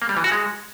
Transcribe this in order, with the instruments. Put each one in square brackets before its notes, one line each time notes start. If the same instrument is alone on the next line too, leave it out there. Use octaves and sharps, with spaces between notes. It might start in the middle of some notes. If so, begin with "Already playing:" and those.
[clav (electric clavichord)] A#3
G3
E3
F#4
G#3